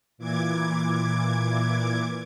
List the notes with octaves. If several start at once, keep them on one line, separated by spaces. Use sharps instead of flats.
A#2 E3 D6 G#6